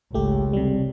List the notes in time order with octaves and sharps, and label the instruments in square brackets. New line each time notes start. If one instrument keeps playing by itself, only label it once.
[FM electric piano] G#1 A3 G4 [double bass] C#2
[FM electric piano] C3 G3